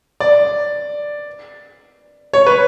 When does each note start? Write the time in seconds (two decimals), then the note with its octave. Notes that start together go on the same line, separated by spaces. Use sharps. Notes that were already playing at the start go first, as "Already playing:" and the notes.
0.20 D5
2.33 C#5
2.46 B4